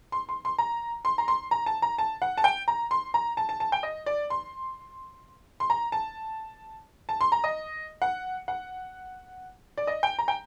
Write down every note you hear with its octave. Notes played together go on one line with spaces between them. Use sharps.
C6
C6
C6
A#5
C6
A#5
C6
A#5
A5
A#5
A5
F#5
A5
G5
A#5
C6
A#5
A5
A5
A5
G5
D#5
D5
C6
C6
A#5
A5
A5
C6
A#5
D#5
F#5
F#5
D5
D#5
G5
A#5
G5